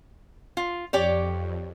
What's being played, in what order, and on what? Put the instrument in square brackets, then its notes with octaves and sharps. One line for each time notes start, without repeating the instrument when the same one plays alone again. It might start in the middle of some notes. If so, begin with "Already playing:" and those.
[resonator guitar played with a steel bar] F4
[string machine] F2 [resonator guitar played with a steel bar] G4 C#5 D5